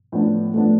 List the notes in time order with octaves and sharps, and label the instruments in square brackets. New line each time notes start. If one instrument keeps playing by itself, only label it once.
[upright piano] A2 F3 B3 D4
[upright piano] A2 F3 B3 D4 [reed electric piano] A3